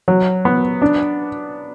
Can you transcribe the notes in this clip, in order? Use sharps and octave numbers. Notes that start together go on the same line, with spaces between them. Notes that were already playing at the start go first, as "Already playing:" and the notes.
F#3
B3
D4